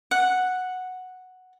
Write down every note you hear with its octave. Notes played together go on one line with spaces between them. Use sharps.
F#5